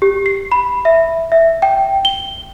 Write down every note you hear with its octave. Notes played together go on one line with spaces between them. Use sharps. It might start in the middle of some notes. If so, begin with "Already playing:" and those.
G4
C7
B5
E5
E5
G5
G7